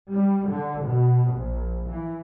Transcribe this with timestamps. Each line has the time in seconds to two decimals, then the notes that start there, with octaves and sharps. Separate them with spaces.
0.12 G3
0.49 D3
0.85 B2
1.35 A#1
1.89 E3